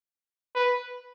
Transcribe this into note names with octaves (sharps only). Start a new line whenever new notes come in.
B4